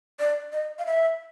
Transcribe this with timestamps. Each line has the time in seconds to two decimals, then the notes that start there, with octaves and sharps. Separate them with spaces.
0.20 D5
0.53 D#5
0.79 F5
0.86 E5